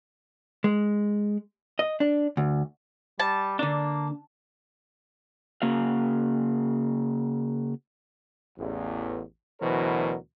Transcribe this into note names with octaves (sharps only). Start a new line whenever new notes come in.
G#3
D#5
D4
D2
G3 A5
D3 A#3 D4
C#3 A#3 F#4 F5
A1 E2
D2 B2 E3 F#3 A#4 C5